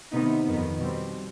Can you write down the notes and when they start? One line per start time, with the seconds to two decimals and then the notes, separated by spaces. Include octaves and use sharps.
0.13 C3 D#3 B3 D#4
0.46 F2 D#3 B3
0.78 B2 G3 C4